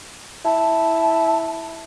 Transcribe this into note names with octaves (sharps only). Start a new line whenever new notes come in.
E4 A5